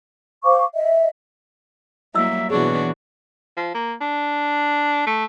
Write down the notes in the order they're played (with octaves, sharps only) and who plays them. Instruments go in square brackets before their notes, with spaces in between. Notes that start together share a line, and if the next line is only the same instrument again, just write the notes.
[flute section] C5 F5 C#6 D6
D#5 E5
[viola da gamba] F#3 G3 A#3 [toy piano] E4 D#5 E6 [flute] E5
[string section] B2 E3 [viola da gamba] D4 F#4 [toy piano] G#4 [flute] C#5
[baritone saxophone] F3
A#3
D4
A3